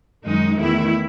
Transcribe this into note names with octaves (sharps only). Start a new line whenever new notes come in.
F#2 D#3 G#3 D#4
E2 D#3 A3 E4